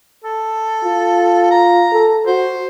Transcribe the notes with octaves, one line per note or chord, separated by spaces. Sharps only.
A4
F4
A#5
A4
F#4 C5